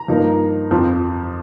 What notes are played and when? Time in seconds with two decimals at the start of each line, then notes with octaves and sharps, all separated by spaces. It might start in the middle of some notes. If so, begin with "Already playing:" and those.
Already playing: A#5
0.08 G2 F3 A#3 D#4
0.71 F2 F3 C4